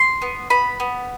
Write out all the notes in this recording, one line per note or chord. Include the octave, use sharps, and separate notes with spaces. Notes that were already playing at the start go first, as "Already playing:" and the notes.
Already playing: C6
B3
B3 B5
B3